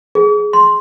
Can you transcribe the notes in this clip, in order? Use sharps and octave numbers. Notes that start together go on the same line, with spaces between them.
G#4
C6